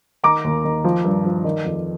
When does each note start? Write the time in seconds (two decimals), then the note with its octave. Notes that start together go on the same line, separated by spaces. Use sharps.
0.23 D#3 A#5 D6
0.44 D#2
0.64 D#3
0.84 F3
1.04 G2
1.25 F3
1.44 D#3
1.65 F2